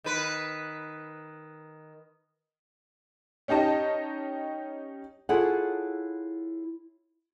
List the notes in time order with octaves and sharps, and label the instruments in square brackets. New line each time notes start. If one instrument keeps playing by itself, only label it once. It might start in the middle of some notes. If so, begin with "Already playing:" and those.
[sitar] D#3 B4
[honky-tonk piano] C#4 D#4 G4 D#5 A5
[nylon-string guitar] E4 F4 G#4 A4 C#5 F#5